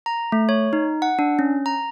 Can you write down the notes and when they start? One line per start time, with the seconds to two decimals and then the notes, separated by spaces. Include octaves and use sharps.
0.06 A#5
0.32 A3
0.49 C#5
0.73 D#4
1.02 F#5
1.19 D4
1.39 C#4
1.66 A#5